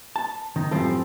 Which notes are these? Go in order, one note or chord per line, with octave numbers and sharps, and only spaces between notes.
A5
D#3 D#4
F#2 A2 F3 G3 C4 A4